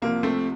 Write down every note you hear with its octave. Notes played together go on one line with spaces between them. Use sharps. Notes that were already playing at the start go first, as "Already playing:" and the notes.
C2 C3 F3 A#3
A3 C4